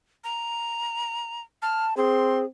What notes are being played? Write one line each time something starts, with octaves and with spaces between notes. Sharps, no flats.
A#5
A5 F6
C4 G#4 C6